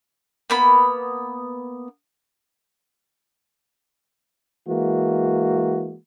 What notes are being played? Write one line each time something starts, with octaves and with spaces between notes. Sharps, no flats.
A#3 B3 B5
E3 G#3 A#3 F#4